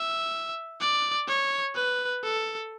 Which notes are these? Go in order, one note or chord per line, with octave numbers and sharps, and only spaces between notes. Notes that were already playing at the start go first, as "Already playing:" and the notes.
Already playing: E5
D5
C#5
B4
A4